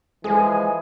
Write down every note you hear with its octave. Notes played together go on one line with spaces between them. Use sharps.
E3 F3 G#3 G#4 G#5